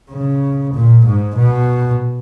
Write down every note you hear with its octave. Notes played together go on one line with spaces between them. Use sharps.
C#3
A#2
G#2
B2